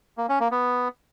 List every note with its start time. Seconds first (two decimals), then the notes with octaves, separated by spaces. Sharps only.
0.18 A#3
0.29 C#4
0.40 A#3
0.51 B3